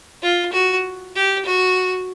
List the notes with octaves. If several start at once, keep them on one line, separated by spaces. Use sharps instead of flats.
F4
F#4
G4
F#4